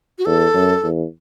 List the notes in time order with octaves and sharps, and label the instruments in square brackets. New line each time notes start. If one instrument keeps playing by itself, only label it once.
[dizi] F#4
[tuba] E2 [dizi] A4
[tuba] F#2
E2